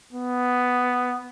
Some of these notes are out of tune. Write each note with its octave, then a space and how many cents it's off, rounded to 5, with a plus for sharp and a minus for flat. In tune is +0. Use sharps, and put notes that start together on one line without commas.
B3 +5